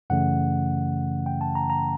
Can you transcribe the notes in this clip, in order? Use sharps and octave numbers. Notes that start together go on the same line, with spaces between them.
F#2 C#3 E3 A3 C#4 F#5
G5
A5
A#5
A#5